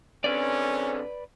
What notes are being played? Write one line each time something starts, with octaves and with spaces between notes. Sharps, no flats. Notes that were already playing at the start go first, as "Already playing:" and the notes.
D3 C4 C#4 B4 D5